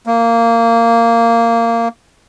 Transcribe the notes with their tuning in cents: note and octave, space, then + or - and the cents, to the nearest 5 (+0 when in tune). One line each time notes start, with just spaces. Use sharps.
A#3 -15